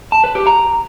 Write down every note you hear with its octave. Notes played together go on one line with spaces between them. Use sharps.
A5
B4
G4
A#5